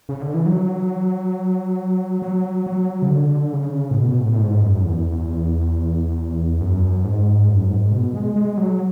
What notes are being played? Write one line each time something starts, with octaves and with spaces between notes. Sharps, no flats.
C#3
D3
E3
F#3
F#3
F#3
C#3
D3
C#3
A2
B2
A2
A2
G#2
F#2
E2
F#2
G#2
F#2
G#2
B2
G#3
G#3
F#3